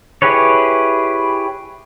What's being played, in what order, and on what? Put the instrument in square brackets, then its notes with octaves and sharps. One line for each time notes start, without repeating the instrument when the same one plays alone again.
[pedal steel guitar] E4 G4 G#4 B4 C#5